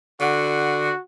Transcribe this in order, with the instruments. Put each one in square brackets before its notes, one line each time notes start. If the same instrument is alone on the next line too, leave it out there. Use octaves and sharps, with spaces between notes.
[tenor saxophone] D3 [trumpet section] F#4